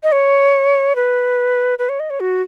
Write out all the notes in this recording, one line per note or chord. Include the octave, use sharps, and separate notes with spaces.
D#5
C#5
B4
B4
C#5
D#5
C#5
F#4